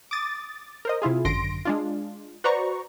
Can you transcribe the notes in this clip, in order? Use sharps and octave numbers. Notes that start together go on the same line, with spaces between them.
D6 D#6 A6
A#4 C5 D#5
C3 E4 F4 G#4
G#1 F#2 D3 C6 A#6 D7
G#3 D4 F4
F#4 B4 C5 D5 A#5 C#6